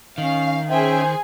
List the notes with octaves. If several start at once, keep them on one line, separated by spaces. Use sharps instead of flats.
D#3 C#4 F5
C#4 G#4 C5 E5 G5 G#5